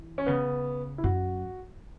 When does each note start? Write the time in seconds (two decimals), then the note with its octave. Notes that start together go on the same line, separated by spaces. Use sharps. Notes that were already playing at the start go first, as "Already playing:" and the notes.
Already playing: E3
0.18 C#4
0.26 C#3 B3
0.98 E4
1.04 F#2 F#4